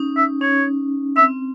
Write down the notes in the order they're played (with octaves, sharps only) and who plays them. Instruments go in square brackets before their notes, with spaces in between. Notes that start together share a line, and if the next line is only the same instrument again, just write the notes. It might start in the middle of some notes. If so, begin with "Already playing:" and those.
Already playing: [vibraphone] C#4 D#4
[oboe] E5
[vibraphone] C#4 [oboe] C#5
[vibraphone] C4 [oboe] E5